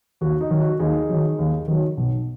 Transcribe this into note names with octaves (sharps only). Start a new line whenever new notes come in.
D#2 F#4
D#4
D#3 F#3
F#4
D#2 D#4 G#4
D#3 F#3
D#2
D#3 F#3
B1